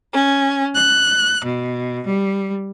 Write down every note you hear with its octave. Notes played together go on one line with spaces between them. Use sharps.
C#4
F#6
B2
G3